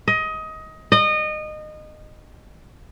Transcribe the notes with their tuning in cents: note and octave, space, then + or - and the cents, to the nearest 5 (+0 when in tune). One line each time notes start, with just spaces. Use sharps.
D#5 +20
D#5 -25